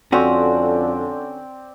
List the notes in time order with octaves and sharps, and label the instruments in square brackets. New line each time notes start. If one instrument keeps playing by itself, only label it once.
[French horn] F2 [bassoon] D3 [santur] C4 D5 [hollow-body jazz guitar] C#4 F#4